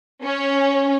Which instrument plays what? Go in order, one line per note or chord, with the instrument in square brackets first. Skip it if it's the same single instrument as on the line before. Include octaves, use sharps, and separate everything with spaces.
[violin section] C#4